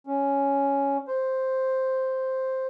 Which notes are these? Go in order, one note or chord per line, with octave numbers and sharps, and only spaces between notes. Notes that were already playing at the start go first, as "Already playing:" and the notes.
C#4
C5